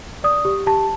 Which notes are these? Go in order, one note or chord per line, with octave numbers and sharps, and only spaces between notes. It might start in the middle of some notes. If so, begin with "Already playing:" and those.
D5 D#6
G4
G4 A5